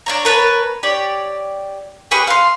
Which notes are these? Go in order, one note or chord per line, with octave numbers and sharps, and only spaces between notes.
D4 C#5 A#5
A#4 B4 C#5 A5
G4 C#5 D5
G4 G#4 B4 C#6
F5 C6